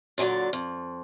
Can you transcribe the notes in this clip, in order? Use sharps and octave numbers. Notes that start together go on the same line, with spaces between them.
A#2 D3 F3 F#3 D5
F2